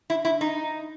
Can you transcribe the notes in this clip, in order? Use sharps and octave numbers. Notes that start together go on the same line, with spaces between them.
E4
E4
D#4